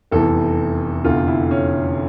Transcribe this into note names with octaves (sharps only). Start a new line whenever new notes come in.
F1 E2 E3 A4
F1 E2 D3 F4
E4
C#4